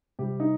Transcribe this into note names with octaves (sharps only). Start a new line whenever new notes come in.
C3 G3 G4
D#4